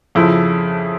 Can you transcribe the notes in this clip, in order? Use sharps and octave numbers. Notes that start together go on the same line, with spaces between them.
F2 C#3 F3 E4